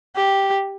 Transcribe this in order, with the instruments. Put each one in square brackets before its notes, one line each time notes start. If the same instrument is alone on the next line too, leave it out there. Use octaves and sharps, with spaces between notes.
[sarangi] G4